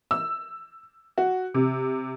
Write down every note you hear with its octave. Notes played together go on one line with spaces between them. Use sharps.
E6
F#4
C3